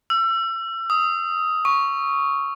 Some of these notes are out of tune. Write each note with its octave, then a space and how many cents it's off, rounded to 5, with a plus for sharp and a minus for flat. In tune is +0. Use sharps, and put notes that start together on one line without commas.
E6 +30
D#6 +15
C#6 +5